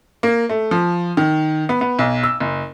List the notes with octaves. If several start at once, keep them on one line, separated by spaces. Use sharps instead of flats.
A#3
A3
F3
D#3
B3
B3
B1
E6
F#1